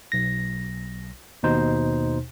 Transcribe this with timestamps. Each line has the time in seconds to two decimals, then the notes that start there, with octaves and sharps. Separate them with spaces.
0.12 B1 A#6
1.43 D#2 B2 D#4 C5